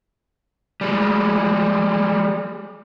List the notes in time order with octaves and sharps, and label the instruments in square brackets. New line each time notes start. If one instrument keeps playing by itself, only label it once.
[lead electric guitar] G3 G#3